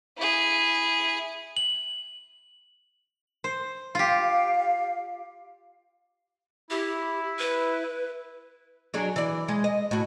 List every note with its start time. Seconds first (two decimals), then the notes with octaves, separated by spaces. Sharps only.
0.18 E4 G#4
1.57 F#7
3.44 C5
3.95 F4 G4 F5
6.71 E4 G4
7.39 B4
8.94 F#3 D4 G#4
9.16 E3 D5
9.48 G#3
9.64 D#5
9.91 A2 F#4